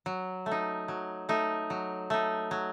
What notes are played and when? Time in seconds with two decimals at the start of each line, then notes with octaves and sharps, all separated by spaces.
0.06 F#3
0.46 A3
0.51 D#4
0.88 F#3
1.29 A3 D#4
1.70 F#3
2.10 A3 D#4
2.51 F#3